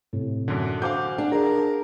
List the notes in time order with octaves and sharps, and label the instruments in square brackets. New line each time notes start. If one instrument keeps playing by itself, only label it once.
[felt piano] A2 C3
[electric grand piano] F#2 D3
[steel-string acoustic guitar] F#4 [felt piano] C5 G#5 D6 [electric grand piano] F5 G6
[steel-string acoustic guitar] D4 [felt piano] F#5
[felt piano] G#4 [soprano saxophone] A#4